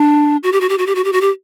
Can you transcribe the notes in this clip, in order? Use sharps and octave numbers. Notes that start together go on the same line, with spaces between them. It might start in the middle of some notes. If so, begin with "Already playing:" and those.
Already playing: D4
F#4
G4
F#4
G4
F#4
G4
F#4
G4
F#4
G4